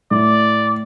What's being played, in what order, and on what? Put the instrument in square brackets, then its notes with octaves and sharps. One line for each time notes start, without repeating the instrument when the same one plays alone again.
[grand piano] A2 [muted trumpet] D5